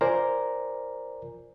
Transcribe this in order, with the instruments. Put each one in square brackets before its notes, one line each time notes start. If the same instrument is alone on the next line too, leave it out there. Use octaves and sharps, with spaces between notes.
[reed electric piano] F4 A#4 C5 D5 G#5 A#5